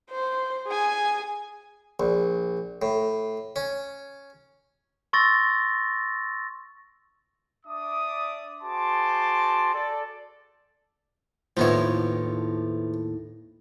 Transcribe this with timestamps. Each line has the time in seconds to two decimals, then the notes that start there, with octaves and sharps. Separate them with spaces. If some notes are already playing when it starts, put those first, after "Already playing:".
0.10 C5
0.67 G#4 G#5
2.00 A#1
2.82 A2
3.56 C#4
5.13 C6 C#6 E6 A6 A#6
7.66 D4 D5 E5 D6 D#6
8.62 F#4 G#4 C5 A5 C6 D6
9.74 A4 D5
11.57 D#2 A2 F3 B3 E4 C#5